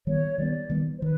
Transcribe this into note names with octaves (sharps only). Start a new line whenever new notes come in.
D#3 G3 B3 C#5
D#3 G3 B3 D5
D#3 G3 B3
C5
D#3 B4